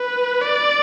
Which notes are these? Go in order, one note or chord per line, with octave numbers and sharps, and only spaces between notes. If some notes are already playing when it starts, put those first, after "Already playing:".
Already playing: B4
D5